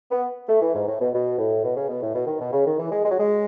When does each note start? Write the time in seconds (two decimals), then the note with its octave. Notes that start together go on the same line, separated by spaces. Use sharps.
0.11 B3
0.49 A3
0.62 E3
0.75 G#2
0.87 A2
1.01 B2
1.13 B2
1.38 A2
1.64 B2
1.77 C#3
1.89 B2
2.02 A2
2.15 B2
2.27 D#3
2.40 B2
2.52 C#3
2.66 D#3
2.78 E3
2.91 G#3
3.04 G#3
3.11 F#3
3.19 G#3